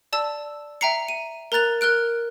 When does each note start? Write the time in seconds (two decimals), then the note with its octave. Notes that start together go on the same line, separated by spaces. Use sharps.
0.13 D5 A5 E6
0.81 E5 G5 A#5 C7 C#7
1.08 D#7
1.52 A#4 A#5 F#6 A6 F7
1.81 A#4 F6 F#6 D7